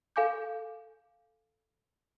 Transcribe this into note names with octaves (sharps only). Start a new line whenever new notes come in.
A4 F5 G#5 D6 G6